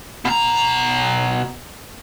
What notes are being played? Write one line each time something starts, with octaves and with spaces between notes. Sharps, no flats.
B2 A#5